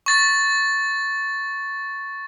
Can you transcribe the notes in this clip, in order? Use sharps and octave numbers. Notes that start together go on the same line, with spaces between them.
C#6 A6